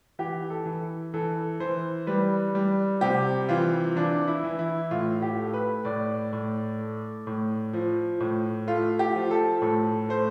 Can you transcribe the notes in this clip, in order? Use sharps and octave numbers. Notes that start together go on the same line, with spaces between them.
E3 G4
A4
E3
E3 A4
E3 C5
G3 B4
G3
C3 G4
E3 F4
E3 D4
E4
E3
E4
A2 F4
G4
A3
B4
A2 D5
A2
A3
A2
F3
A2
A3 F4
G4
F3
A4
A2 A4
A3 C5